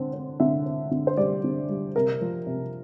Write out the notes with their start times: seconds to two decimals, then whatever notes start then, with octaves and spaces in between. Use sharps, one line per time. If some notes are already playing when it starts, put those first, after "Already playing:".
Already playing: D3 C4
0.14 C4
0.40 D3 E5
0.66 C4
0.91 D3
1.07 C5
1.17 G3 D5
1.44 D3
1.69 G3
1.95 C3 A#4
2.21 F3
2.47 C3